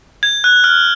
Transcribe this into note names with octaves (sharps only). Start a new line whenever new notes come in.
G#6
F#6
F6